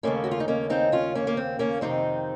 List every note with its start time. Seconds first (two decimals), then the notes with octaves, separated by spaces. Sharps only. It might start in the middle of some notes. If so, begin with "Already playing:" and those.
0.03 D#2 C#3 A3 A#3 C#4
0.24 F#4
0.31 F4
0.40 D#4
0.48 A#3 C#4
0.70 C4 D#4
0.92 C#4 F4
1.15 A#3 C#4
1.27 A#3
1.37 C4
1.59 A#3 C#4
1.81 F2 C3 D#3 C4 D#4